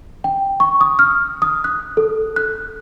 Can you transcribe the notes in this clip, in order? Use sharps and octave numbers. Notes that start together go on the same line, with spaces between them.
G5
C#6
D#6
F6
D#6
F#6
A4
F#6